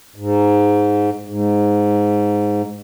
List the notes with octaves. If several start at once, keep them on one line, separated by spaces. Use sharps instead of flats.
G#2
G#2